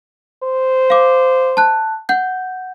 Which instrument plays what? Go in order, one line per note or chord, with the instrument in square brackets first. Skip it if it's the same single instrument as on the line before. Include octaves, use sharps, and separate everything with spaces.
[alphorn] C5
[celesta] F5 D6
A5 F#6
F#5 G6